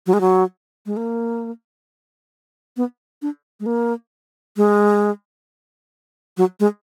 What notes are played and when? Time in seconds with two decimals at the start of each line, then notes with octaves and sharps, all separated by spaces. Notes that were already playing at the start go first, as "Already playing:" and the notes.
0.07 F#3
0.13 G#3
0.21 F#3
0.86 G#3
0.97 A#3
2.77 B3
3.22 D4
3.60 G#3
3.66 A#3
4.57 G#3
6.37 F#3
6.60 G#3